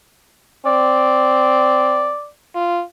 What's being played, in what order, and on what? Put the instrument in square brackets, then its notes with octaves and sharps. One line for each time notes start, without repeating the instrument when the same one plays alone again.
[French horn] C4 [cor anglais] D5
[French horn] F4